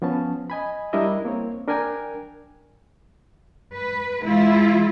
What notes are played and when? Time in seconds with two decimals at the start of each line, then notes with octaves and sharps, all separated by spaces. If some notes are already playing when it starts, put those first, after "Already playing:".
0.02 F3 B3 C#4 A5
0.50 D#5 G#5 B5
0.93 G3 D4 E4 A#4 D#5 E5
1.25 A#3 C4 C#5
1.67 D4 A#4 G5 G#5
3.74 B4
4.23 E3 G#3 E4 F4